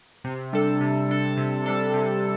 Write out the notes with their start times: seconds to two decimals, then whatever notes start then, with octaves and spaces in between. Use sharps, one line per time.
0.24 C3
0.53 G3 D4 A4
0.81 C3
1.09 G3 D4 A4
1.37 C3
1.66 G3 D4 A4
1.94 C3